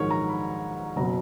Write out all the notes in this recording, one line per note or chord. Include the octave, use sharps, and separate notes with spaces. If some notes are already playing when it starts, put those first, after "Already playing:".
Already playing: A#1 G#2 D#3 F#3 G#4 A#4 C#5
A#5
B5
F#1 B2 F#3 A#5